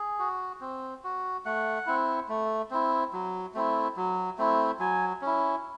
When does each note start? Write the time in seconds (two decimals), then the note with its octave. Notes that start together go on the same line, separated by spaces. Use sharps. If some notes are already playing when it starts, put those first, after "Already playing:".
Already playing: G#4
0.19 F#4
0.61 C4
1.04 F#4
1.45 A3 F#5
1.86 C4 E4
2.29 A3
2.71 C4 E4
3.13 F#3
3.54 A3 C4 E4
3.97 F#3
4.38 A3 C4 E4
4.79 F#3 G#5
5.22 C#4 E4